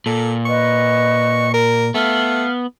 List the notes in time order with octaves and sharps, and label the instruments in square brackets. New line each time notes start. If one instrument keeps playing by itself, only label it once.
[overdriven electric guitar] A#2 [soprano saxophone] A4
[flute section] B4 D#5 [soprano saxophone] C#6
[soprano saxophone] A#4
[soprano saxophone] A3 [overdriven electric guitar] B3 [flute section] F5 F6